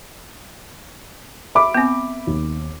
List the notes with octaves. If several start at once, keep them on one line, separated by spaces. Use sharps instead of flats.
E5 B5 D6
B3 C4
D#2